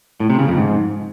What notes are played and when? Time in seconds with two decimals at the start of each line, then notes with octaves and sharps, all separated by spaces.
0.20 A2
0.30 C3
0.39 C#3
0.48 F2
0.58 G#2